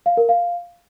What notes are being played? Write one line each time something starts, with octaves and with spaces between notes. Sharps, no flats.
F5
A#4
F5